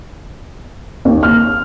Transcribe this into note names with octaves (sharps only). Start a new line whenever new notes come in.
D#2
F6